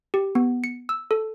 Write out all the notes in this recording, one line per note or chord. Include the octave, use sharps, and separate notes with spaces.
G4
B3
C#7
E6
A4